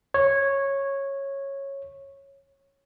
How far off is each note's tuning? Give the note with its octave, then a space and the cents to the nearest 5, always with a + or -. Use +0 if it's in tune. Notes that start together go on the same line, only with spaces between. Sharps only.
C#5 -10